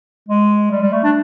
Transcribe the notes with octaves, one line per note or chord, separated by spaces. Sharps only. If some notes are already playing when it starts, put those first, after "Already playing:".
G#3
G3
G3
A3
D4